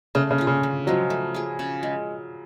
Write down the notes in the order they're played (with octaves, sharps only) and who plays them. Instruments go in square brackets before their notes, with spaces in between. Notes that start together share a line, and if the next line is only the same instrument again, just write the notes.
[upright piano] C#3 [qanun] A3
[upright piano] C#3
[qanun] C#4 F4
[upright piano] C#3
[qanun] D3
[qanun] F3 G#3 [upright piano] F#3
[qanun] A3
F4 G#4
C#3
G#3